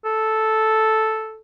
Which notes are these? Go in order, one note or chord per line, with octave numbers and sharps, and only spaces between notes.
A4